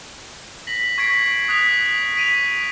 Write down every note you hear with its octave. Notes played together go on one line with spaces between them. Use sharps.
A#6 B6 F#7
C#6 G#6 B6 C7 D7
D#6 F#6 B6 F7
B6 D7 D#7 F7